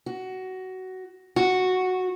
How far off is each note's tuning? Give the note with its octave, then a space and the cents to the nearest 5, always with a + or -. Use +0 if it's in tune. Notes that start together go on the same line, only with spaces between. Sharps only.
F#4 +15
F#4 -5